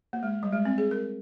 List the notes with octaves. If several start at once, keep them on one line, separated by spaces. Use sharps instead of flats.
A#3
G#3
G3
G#3
C4
G#4
A#4